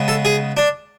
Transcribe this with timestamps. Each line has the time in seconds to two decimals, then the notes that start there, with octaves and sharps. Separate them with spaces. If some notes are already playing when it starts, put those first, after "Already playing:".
Already playing: C#3 G#3 B3
0.08 A4
0.25 G#4
0.57 D4